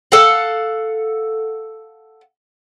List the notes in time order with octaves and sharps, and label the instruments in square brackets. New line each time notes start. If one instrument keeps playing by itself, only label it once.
[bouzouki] A4 F5 F#5